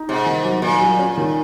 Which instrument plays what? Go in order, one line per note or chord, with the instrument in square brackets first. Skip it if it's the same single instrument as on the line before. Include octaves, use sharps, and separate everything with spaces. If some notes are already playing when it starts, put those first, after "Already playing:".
Already playing: [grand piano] D#4
[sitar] G#2 [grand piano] C3
[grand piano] D#3
F#3
[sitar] A#2 [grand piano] D#3
[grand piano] F#3
C#4
D#3